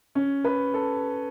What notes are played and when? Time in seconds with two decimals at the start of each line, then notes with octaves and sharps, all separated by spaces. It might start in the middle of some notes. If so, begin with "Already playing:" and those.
0.15 C#4
0.44 B4
0.74 A4